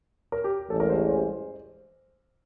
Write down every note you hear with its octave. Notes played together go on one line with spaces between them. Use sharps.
A#4
G4
A1 G2 E3 G#3 A4
A#4
C5
C5